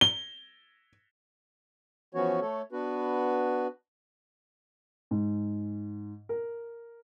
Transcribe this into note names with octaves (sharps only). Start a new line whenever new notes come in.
G7
E3 F3 B3 C#4 F#4 C#5
A3 A4 C#5
B3 D4 F#4 B4
G#2
A#4